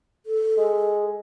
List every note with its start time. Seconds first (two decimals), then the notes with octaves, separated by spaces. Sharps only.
0.26 A4
0.57 G#3